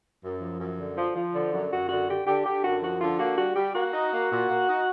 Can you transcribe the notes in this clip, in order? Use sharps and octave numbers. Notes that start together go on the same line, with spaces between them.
F#2
F3
F#2
D3
F3
F3
D3
F#2
F#2 F#4
D3 F#4
D3 G4
D3 G4
D3 G4
F#2 F#4
F3 F#4
D3 F4
A#3 F#4
G3 F#4
G3 G4
A#3 F#4
D#4
A#3
A#2
A#3
D#4